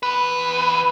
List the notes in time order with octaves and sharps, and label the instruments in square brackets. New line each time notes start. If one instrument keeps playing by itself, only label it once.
[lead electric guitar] E2 B4